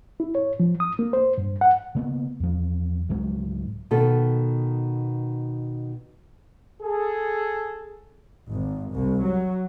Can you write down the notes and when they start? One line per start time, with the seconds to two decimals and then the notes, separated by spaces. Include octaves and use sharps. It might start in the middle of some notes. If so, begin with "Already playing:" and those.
0.20 E4
0.35 C#5
0.60 F3
0.80 D#6
0.99 A#3
1.13 C5
1.38 G2
1.61 F#5
1.95 C#3 A#3 B3
2.40 E2 F3
3.09 C#2 G#2 F#3 G#3
3.91 B2 D#3 A4
6.83 G#4 A4
8.51 G#1
8.93 C2
9.24 F#3